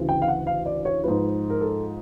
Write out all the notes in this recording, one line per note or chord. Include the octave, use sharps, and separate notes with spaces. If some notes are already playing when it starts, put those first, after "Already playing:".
Already playing: D2 C#3 E3
G5
F5
F#5
F5
D5
C#5
G#2 F3 B4
A#4
A4